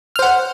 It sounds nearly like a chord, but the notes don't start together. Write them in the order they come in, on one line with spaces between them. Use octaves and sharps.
F6 C5 F#5